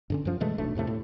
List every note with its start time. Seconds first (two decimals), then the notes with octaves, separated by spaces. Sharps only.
0.10 G2 D3 C#4
0.25 F#2 F3
0.40 B2 E3 G#3 A3
0.58 D#1 B1 A3 D4
0.75 E2 A2 C3 A3
0.87 A2